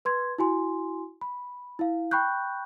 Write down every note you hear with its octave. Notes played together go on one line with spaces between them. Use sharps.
B4 C6 G#6
E4 F#4 G#5 C6
B5
E4 F5
G5 B5 C#6 F#6 G6